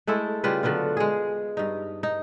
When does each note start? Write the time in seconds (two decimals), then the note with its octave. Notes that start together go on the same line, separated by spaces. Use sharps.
0.07 G#3 A3 E4 A4
0.44 C#3 G3 F4 B4
0.63 D3 F#3 B3 F4
0.97 G#3 G#4
1.57 G2 D#4
2.03 D#4